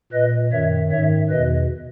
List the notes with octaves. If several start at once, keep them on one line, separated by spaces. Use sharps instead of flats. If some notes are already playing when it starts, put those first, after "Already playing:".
A#2 B4 D#5
F#2 D#3 C#5 E5
G#2 D#3 C#5 E5
E2 B2 B4 D#5